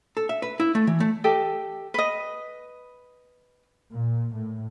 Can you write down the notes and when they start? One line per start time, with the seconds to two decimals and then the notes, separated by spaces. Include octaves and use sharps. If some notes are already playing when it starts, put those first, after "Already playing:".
0.17 A4
0.29 E5
0.42 B4
0.60 E4
0.75 A3
0.87 E3
1.00 A3
1.24 G4 A4 D#5
1.94 B4 D#5
3.92 A#2
4.34 A2